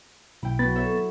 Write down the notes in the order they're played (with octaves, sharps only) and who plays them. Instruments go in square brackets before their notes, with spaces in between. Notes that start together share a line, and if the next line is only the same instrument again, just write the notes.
[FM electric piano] B1 [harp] E4 G5
[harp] F#3 B5 [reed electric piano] B3 A6
[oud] A4 [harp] C#5 E5